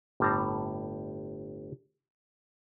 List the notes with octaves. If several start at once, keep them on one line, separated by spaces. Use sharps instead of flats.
G1 A2 G3 C4 A5 A#5